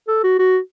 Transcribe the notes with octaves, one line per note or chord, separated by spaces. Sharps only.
A4
F#4
F#4